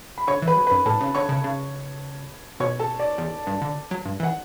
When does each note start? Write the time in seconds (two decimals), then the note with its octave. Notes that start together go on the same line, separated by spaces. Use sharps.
0.18 B5
0.27 D3 C#5 C#6
0.42 E3
0.47 B4 B5
0.57 F#2
0.67 B4 B5
0.71 F#2
0.86 A2 A4 A5
1.01 C#3
1.15 D3 C#5 C#6
1.29 C#3
1.44 C#3
2.60 B2 C#5 C#6
2.80 A4 A5
2.99 D5
3.18 E2
3.47 G2
3.62 D3
3.91 F#3
4.05 G2
4.20 E3 F#5